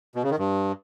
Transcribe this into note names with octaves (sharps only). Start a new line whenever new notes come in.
B2
C#3
D#3
G2